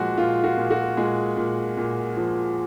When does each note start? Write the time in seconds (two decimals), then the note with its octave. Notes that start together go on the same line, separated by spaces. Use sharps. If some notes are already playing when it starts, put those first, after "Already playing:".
Already playing: A#2 F3 G#3 F#4 G#4
0.18 A#2 F4
0.44 F#4
0.57 A#2
0.71 F#4
0.97 A#2 G#3 G#4
1.37 A#2
1.77 A#2
2.17 F3